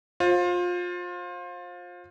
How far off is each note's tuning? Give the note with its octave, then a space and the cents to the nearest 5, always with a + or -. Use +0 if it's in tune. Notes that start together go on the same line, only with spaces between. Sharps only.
F4 +25 C5 +25